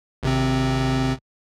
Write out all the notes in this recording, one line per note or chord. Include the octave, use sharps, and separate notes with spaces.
G#1 C3 C4